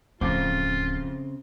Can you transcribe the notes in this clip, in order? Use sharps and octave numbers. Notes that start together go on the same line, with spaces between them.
D1 F2 C#3 B3 C4 F4 C5 D6